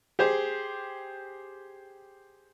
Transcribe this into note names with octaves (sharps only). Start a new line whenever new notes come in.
G4 G#4 C5